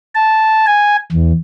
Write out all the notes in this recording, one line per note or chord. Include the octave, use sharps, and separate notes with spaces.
A5
G#5
E2